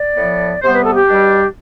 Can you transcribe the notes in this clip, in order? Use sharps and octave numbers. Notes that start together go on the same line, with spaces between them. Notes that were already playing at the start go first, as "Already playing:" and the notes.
Already playing: D5
A2 F3 B3
C3 G3 B3 C5
B4
A4
G4
B2 G3 D4